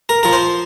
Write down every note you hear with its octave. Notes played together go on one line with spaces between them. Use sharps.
A#4
F3 A#4
C5